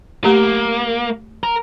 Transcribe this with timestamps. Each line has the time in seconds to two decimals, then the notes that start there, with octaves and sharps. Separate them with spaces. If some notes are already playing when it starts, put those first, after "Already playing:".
0.24 A3 A#3 G4 A#5
1.43 A#4